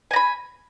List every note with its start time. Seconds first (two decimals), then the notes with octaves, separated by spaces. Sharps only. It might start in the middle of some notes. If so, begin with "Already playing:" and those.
0.11 G#5
0.13 A#5
0.16 B5